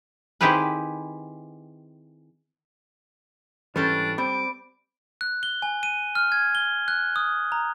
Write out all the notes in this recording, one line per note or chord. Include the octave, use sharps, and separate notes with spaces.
D#3 C4 E4 G4 G#4 B4
G#2 E3 G3 C#4 D4 A4 B4
G3 C4 B5 D6
F#6
G7
G#5
D#7
F6
G#6
G7
F#6
D#6
A#5